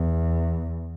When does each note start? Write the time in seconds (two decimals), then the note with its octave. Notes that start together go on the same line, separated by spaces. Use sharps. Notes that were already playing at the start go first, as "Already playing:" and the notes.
Already playing: E2